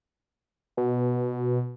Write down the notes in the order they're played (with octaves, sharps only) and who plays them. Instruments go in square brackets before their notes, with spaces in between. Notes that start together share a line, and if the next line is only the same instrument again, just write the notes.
[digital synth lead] B2